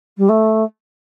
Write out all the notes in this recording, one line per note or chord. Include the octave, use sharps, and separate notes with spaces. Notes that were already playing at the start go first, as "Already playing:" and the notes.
G3
A3